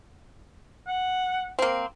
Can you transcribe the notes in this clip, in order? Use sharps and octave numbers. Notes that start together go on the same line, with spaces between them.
F#5
A#3 C4